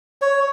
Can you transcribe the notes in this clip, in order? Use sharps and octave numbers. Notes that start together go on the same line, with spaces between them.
C#5